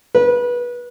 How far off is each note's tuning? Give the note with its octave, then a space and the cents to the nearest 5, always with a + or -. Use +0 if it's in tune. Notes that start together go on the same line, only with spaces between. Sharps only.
B4 -25